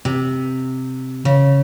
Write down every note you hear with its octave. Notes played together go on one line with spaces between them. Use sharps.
C3
C#3